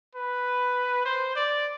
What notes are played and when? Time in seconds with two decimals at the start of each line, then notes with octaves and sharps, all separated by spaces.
0.15 B4
1.05 C5
1.36 D5